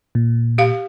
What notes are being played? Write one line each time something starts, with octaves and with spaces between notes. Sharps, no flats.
A#2
G4 F5